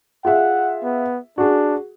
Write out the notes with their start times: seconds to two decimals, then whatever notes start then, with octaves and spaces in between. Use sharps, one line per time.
0.25 F4 G#4 E5 F#5
0.83 B3
1.38 D4 F#4 G#4